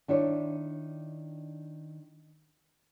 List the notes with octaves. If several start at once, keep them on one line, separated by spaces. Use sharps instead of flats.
D#3 D4 E4 C#5